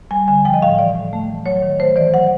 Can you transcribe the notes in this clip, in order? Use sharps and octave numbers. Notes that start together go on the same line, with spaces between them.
G3 G#5
D3 G#5
F3 G5
D#5
A2 F5
E3 D5
A2
A3
E3
F#3 C#5
D#3
A3 C5
E3 D5
F#3 F#5